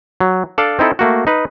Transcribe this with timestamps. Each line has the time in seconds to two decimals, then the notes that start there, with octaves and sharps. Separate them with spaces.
0.20 F#3
0.58 D4 A4 D5 F5
0.79 C4 D#4 E4 A4
0.99 A3 A#3 F#4
1.27 D#4 B4